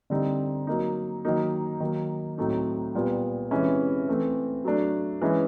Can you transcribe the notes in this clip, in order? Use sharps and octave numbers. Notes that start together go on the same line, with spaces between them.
D3 G3 C4 D#4
F#3 A#3 D#4
D#3 F#3 A#3 D#4
D#3 F#3 A#3
A2 F#3 A3 C4 D#4
A#2 G3 B3
C3 E3 G#3 C#4 E4
E3 A3 C4
F#3 A3 D4
E3 G#3 C#4 E4